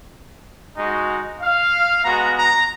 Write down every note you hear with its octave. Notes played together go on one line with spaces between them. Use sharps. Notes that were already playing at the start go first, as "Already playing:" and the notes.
G#3 D#4 F#4
F5
G#3 B3 F#4 A#5
A#5